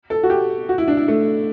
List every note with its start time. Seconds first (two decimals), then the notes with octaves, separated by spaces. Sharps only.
0.10 A4
0.23 F#4
0.30 G4
0.69 F#4
0.78 E4
0.88 D4
0.97 E4
1.08 A3